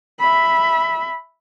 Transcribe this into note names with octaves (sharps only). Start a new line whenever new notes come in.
E5 B5